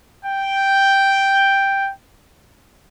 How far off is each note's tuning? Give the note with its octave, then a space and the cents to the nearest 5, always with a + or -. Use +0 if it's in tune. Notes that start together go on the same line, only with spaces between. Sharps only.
G5 +0